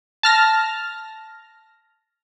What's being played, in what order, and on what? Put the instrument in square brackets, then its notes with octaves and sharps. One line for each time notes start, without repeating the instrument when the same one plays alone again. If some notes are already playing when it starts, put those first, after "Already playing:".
[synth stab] A5 F6 A#6